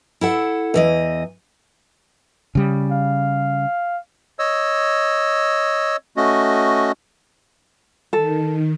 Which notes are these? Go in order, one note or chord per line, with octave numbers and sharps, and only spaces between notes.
E4 A4 F#5
E2 E3 D#5
C#3 G3
F5
C#5 D#5 E6
A3 C#4 F#4 D#5
D#3 A4